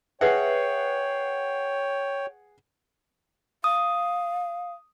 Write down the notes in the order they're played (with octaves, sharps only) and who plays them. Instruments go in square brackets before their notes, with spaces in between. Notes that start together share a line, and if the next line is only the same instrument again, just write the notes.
[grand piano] G#4 F#5 [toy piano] B4 E5 [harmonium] C#5 G5
[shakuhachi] F5 [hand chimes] D#6